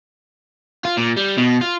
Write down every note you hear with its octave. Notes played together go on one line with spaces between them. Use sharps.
F4
A#2
G3
B2
F4